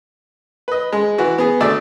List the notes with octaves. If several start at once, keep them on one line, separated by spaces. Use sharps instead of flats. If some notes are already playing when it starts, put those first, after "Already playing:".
B4 D#5
G#3
E3 F#4
B3 G#4
D2 A3 D5 A5 E6